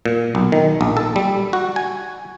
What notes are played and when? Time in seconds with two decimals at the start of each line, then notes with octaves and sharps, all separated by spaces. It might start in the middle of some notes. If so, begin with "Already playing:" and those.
0.06 A#2
0.35 B1
0.52 D#3
0.81 A#1
0.97 A4
1.16 G3
1.53 F#4
1.76 G#5